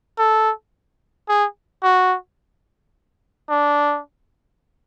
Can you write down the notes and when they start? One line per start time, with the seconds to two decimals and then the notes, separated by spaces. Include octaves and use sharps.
0.18 A4
1.29 G#4
1.83 F#4
3.50 D4